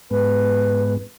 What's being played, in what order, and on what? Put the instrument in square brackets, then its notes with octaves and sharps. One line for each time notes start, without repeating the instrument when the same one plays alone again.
[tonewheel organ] G#2 G#3 B3 [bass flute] B4